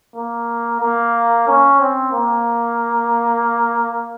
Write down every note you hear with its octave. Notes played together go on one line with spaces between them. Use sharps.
A#3
A#3
C#4
C4
A#3